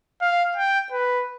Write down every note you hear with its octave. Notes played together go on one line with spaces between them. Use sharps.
F5
G5
B4